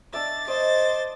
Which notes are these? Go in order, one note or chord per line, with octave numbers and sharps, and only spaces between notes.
D4 D5 E5 A6
C5 D5 D#5 A6